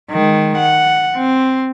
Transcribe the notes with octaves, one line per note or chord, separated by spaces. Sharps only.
D#3 G#3
F#5
C4